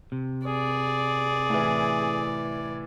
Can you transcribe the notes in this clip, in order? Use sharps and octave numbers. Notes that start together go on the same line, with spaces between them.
C3
G#4 D5
A2 E3